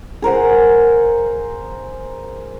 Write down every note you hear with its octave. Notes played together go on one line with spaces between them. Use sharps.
G#4 A#4 C5 F#5